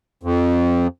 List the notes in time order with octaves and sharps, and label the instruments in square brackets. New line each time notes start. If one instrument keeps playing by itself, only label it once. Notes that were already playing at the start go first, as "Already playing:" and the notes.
[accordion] F2